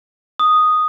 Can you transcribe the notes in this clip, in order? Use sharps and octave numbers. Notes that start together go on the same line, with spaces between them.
D#6